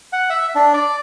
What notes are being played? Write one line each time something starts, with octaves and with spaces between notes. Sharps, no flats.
F#5
E5
D4
D5